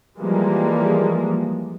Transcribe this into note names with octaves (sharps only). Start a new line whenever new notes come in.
E3 F3 G3 G#3 A#3